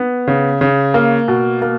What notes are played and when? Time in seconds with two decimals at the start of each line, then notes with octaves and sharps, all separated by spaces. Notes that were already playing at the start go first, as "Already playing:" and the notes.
Already playing: B3
0.27 C#3
0.61 C#3
0.94 A#3
1.28 B2
1.62 A#3